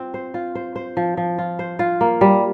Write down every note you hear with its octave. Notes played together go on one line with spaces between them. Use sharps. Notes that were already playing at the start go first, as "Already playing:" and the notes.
Already playing: C4 F4
C5
F4
C5
C5
F3
F3
F4
C5
F4
A#3
G3